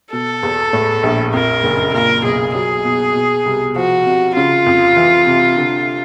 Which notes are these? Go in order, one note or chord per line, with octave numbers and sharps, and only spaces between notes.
B2 A4
E2
A2
A#1
F2 A#4
F#1
A#2 A#4
B1 G#4
F#3 G#4
B2
B2
C2
F3 F#4
C3
C#3 F4
F2
E3
C3
D3